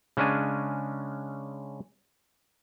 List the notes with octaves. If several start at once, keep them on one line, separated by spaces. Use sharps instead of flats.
C#3 G#3 C#4 D4 G#5